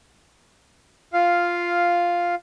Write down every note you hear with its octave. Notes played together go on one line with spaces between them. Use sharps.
F4 F5